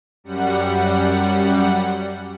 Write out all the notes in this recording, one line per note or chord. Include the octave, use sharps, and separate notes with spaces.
F#2 G3 F#5